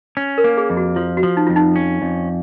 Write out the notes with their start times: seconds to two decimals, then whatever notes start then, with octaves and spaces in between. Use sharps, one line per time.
0.17 C#4
0.38 A#4
0.44 A#3
0.57 G#4
0.70 F2
0.77 F#4
0.96 F3 F4
1.17 F#4
1.23 F3
1.37 D#4
1.47 F2 F4
1.56 D#4
1.76 C#4
2.02 F2